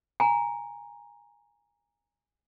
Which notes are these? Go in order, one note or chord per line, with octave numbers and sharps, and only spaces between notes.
G#5 A#5